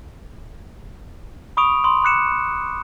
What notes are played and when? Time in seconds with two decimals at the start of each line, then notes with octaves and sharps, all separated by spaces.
1.57 B5 C#6 D#6 D7 F7
1.84 B5 C6 D#6
2.03 B5 D6 F#6 C#7 E7